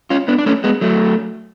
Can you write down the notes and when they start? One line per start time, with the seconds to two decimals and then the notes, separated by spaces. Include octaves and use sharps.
0.10 C#4 F4
0.28 B3 D4
0.38 D4
0.46 A3 C#4
0.64 G#3 B3
0.81 F#3 A3